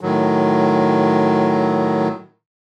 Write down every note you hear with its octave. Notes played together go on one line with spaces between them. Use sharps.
A2 D#3 F#3